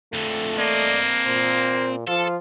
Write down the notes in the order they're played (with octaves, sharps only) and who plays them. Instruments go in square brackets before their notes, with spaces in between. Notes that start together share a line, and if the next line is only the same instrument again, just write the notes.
[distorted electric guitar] F2 D3 [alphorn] A3
[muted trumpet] A#3 [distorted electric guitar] C4 D#5 [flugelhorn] D5
[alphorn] A#2 [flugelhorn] C5
[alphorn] F3 [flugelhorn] F4 [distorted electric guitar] A4